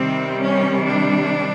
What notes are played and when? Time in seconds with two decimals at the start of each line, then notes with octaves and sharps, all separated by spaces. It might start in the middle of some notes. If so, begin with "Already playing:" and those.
Already playing: C3 D#3 G3 C4
0.41 C#4
0.88 D4